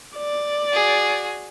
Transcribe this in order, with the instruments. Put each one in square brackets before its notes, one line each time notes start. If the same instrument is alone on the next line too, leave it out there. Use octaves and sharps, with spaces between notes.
[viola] D5
[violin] F#4 G#4